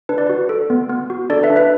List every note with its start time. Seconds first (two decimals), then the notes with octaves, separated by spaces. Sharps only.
0.09 D4 B4
0.18 D5
0.27 F#4 B4
0.49 A4
0.70 B3
0.89 B3
1.10 F#4
1.30 D4 A4 D5
1.43 B4 E5
1.50 D4
1.56 B4 E5